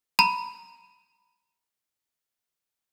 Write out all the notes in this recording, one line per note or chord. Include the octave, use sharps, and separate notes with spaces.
A#5 B5